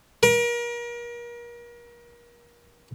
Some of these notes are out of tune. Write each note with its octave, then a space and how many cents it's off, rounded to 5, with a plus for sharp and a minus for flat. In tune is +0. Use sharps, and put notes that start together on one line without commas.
A#4 +35